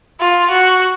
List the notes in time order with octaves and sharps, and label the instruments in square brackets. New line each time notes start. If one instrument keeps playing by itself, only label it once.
[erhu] F4
F#4